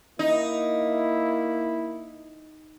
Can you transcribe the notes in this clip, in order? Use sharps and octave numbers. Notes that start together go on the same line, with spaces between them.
A#3 D#4 E4